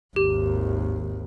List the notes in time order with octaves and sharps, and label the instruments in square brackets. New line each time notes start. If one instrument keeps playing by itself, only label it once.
[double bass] G#1 D#2 [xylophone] G4